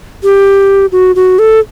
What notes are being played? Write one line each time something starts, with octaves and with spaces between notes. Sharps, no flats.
G4
F#4
F#4
A4